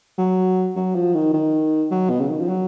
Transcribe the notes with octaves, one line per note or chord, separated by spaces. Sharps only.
F#3
F#3
F3
D#3
D#3
F#3
B2
C#3
D#3
F3
F#3